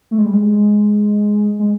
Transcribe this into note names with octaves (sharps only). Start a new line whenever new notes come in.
A3
G#3
G3
G#3
G#3